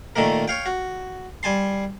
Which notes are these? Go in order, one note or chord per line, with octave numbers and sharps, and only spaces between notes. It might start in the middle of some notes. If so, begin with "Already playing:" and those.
A#2 D#3 A3 A#3 A#4
C#5 F5 G5
F#4
G3 G#5 A5 C6